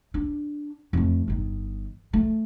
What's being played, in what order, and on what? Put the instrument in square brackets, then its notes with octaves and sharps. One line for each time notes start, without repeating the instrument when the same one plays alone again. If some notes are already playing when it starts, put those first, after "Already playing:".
[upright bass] D4
F2 A3
G1 D#3
A3